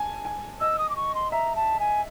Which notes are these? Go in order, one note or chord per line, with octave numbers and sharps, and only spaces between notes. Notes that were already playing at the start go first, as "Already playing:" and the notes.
Already playing: G#5 A5
G#5
D#5 E6
D#6
D6
C#6
C6
E5 A#5
A5
G#5